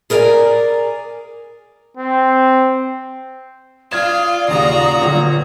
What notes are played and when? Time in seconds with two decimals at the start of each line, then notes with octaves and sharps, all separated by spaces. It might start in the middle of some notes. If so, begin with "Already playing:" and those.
0.10 G#4 A#4 D5 E5 G#5 A#5
1.97 C4
3.91 F4 D5 F5 D#6 F6 G#6 E7
4.48 D#2 A#2 C#3 F#4 A#5
5.01 G1 A#2 F#3